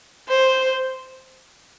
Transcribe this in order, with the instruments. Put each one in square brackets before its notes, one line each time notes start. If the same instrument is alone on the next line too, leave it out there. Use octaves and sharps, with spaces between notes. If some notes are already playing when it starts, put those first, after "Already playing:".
[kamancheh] C5